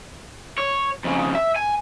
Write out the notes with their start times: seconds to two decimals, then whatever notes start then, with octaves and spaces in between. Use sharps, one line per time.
0.58 C#5
1.04 F2 C#3
1.35 E5
1.56 G#5